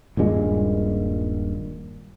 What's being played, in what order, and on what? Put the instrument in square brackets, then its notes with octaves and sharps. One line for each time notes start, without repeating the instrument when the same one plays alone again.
[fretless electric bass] D#1 G2 A#2 G#3